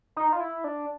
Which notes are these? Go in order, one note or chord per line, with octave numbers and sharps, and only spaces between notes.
D#4
F4
E4
D4